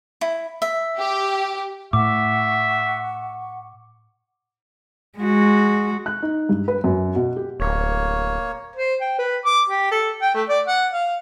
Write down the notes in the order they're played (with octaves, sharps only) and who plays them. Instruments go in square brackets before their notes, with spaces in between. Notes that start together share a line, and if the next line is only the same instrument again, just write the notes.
[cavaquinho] E4
E5
[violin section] G4
[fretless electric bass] A2 [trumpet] E5 [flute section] F#5 C#6 [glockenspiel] D6
[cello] G#3 F#4
[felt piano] F#6
D#4
G2
B4
F#2
B2
G4
[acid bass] D1 [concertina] A#3 C#5
[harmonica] C5
G5
B4
D6
G4
A4
G5
A3
D5
F#5
F5